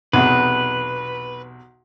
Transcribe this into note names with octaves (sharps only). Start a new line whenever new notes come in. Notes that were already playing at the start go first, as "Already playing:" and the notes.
B1 E2 C3 B4